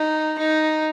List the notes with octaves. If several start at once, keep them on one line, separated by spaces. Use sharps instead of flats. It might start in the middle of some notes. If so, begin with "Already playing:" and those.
Already playing: D#4
D#4